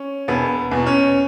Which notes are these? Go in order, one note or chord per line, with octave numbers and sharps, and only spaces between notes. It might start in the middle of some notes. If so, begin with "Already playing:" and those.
Already playing: C#4
E1 B3
E2 B2
C#4